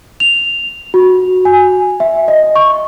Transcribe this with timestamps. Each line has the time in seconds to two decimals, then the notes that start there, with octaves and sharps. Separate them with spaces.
0.20 F7
0.94 F#4
1.45 G#5
2.00 E5
2.28 D#5
2.56 C#6